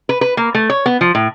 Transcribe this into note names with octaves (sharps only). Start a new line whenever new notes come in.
B4
B4
A#3
A3
C#5
B3
F3
A2